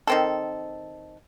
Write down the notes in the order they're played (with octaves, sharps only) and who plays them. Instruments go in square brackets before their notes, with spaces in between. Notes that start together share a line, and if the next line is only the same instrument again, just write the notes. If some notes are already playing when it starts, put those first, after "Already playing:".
[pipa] D#3 C4 A4